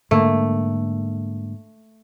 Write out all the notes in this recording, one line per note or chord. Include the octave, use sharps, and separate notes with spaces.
G#2 D3 A3 A#3